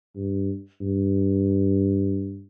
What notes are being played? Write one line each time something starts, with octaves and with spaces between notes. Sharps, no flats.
G2
G2